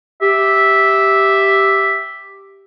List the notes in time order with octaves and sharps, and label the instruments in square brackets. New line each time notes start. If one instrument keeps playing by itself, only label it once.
[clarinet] G4 [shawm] E5